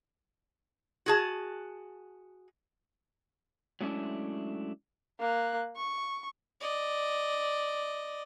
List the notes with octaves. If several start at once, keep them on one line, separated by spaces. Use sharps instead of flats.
F#4 G#4 A5
F#3 G#3 A3 C#4 D4 E4
A#3 F#6
C#6
D5 D#5